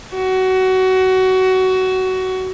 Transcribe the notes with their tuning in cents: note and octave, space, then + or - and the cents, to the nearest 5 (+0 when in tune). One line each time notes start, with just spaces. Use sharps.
F#4 +20